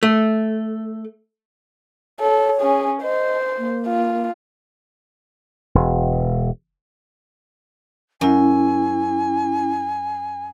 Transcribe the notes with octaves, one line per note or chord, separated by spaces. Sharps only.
A3
A4 C#5
C#4 G#4
C5 D#5
A#3
F4
E1
F#2 C#4 E4 G#5